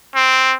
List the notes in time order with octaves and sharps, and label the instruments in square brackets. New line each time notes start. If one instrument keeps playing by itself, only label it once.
[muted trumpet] C4